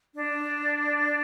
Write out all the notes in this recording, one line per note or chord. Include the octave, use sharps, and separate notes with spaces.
D4